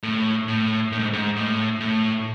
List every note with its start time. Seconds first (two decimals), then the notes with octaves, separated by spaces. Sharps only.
0.03 A2
0.48 A2
0.92 A2
0.99 G#2
1.13 G#2
1.36 A2
1.80 A2